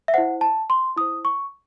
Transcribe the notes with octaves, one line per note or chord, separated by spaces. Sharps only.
E5
E4 C5 F#5
A5
C6
E4 C5 D#6
C#6